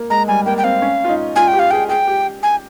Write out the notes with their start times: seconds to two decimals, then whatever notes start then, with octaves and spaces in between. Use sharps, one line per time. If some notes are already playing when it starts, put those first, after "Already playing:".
Already playing: A#3
0.10 G#3 A#5
0.28 G3 G#5
0.46 A#3 G5
0.58 G5
0.64 C4 F5
0.82 C#4
1.05 F4
1.09 D#4
1.36 F4 G#5
1.48 G5
1.53 G4
1.59 F5
1.71 G#4 G5
1.89 G#4 G5
2.07 G4
2.43 G#5